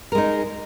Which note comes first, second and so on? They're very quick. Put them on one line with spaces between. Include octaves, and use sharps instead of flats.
A#4 G#3 D#4